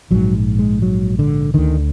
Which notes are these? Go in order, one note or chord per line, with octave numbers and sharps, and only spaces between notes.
A#1 G#2 F#3
G#3
F#3
D3
D2 D3 D#3